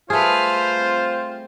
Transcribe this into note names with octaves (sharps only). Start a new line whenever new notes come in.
G3 A3 F4 G#4 B4 C5 F6
G3 C4